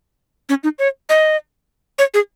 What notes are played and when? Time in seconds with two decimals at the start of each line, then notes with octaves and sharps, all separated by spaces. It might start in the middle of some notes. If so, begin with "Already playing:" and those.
0.49 C#4
0.64 D#4
0.79 C#5
1.09 D#5
1.99 C#5
2.14 G#4